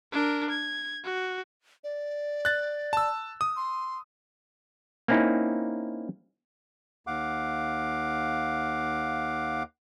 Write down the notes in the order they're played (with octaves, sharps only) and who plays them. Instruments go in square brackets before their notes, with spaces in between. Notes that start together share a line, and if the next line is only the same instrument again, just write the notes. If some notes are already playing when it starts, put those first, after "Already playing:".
[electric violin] D4 A#4
G#6
F#4
[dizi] D5
[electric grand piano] F#6 A6
A5 E6
D#6
[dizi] C6
[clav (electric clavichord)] A#3 C4 C#4 D#4 E4
[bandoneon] D#2 F5 F#5 D6